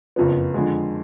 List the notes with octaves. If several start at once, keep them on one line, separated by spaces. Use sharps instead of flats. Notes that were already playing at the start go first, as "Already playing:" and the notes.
F#1 F2 F3 B3
F2 D3 G#3